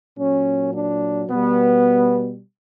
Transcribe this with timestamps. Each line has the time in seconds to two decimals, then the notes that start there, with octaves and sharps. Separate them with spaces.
0.17 A#2 F#3 C#4
0.73 D4
1.29 B2 G3 B3